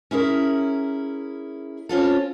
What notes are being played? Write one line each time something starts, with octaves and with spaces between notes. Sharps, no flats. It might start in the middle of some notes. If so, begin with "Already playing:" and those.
C#4 E4 G#4 A#4
C4 C#4 F4 A4